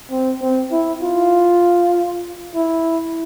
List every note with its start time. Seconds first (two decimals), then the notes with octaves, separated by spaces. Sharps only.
0.11 C4
0.42 C4
0.72 E4
1.03 F4
2.55 E4